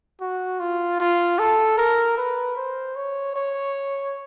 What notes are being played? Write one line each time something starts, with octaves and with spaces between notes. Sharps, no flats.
F#4
F4
F4
A4
A#4
B4
C5
C#5
C#5